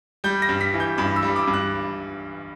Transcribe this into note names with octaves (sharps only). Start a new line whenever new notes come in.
G3 G6
A#6
G2
B6
E3
G6
G2 B5
E6
G3
D6
G2
F#6